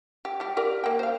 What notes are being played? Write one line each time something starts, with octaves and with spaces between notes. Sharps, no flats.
G4
G3 G4
G4 A#4 D5
A#3 G5
C5 F5